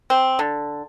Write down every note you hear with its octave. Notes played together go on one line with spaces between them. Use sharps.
C4
D3